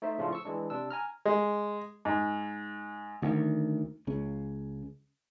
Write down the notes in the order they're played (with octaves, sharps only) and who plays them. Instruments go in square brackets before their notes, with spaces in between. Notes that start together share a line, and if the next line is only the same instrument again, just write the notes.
[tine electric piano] A3 D#4 C5 E5
A2 C#3 F3 A3 D4 F4
C#6 E6
E3 G#3 D4
C3 D4 E6
G#5 A#5 F6
[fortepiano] G#3
G#2
[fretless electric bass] D2 D#3
C#2 C#3